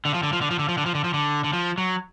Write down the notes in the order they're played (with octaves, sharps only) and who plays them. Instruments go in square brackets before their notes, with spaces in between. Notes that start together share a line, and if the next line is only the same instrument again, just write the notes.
[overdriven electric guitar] D3
F3
D3
F3
D3
F3
D3
F3
D3
F3
D3
F3
D3
D3
F3
F#3